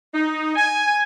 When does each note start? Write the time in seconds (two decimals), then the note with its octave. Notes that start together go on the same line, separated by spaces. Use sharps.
0.13 D#4
0.55 G#5